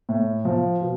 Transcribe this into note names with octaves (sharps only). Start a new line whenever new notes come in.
A2
F3
B2